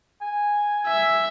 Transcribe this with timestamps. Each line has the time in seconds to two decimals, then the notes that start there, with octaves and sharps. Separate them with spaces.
0.21 G#5
0.87 E5